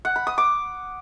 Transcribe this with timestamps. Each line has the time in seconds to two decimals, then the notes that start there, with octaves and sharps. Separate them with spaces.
0.05 F#5
0.16 B5
0.27 D#6
0.38 D6